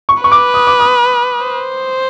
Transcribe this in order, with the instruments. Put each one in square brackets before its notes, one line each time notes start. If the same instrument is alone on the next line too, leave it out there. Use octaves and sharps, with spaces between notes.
[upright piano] C#6
[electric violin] B4 [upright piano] C#6
[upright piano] D6
D#6
D6
D#6
[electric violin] C5